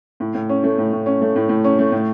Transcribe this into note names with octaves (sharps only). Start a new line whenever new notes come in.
A2
A2
C#4
A3
A2
A2
C#4
A3
A2
A2
C#4
A3
A2